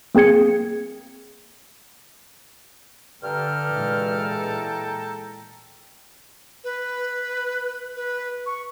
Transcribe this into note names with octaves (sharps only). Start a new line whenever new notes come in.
A#3 C4 G#4 G#6 C#7
G2 D3 A4 G5 A#5 F6
A#2 E3 G#3
B4
B4
C#6